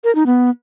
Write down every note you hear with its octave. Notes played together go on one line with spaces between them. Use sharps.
A#4
D#4
B3